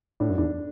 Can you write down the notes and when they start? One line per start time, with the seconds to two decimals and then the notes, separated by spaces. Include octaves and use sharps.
0.20 A2 D4
0.30 F#2
0.38 E2 D4